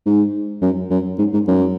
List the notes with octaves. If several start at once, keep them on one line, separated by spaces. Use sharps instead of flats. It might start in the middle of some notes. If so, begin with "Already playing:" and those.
G#2
F#2
F#2
G#2
G#2
F#2